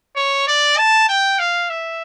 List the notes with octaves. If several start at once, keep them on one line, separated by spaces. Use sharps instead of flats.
C#5
D5
A5
G5
F5
E5